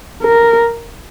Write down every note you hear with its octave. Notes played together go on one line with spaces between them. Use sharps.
A#4